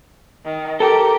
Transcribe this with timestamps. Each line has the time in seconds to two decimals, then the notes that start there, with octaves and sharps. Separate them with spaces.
0.45 D#3
0.80 G4 A4 A#4